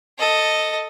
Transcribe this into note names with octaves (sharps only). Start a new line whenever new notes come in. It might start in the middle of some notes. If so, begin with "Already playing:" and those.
A4 D#5